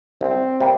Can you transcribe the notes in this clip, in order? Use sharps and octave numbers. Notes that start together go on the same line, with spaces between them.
C2 C4
C3 G3 A#3